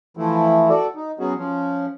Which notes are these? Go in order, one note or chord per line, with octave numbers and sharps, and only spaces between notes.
E3 F3 A3 E4
F#4 A4 D5
D#4
F#3 B3 C#4 F#4 G#4
F3 C#4